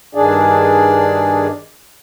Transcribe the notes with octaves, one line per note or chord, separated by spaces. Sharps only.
G2 D#3 D4 G#4 D5